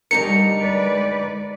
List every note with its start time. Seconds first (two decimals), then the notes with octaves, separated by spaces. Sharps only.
0.11 D2 G3 D#4 A#4 C#7
0.58 G#3 B4 D5